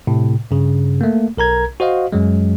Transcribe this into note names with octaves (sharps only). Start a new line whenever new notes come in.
A2 C3
G2 C#3
A3 A#3
B1 A#4 A#5 G#6
F#4 C5 D#5 F5
F#2 F#3 G#3